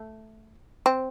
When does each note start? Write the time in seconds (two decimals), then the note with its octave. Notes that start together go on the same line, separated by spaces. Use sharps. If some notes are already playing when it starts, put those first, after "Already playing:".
Already playing: A3
0.86 C4